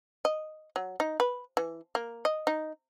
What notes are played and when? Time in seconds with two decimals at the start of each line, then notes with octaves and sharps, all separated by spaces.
0.25 D#5
0.76 F#3
1.00 D#4
1.20 B4
1.57 E3
1.95 A#3
2.25 D#5
2.47 D#4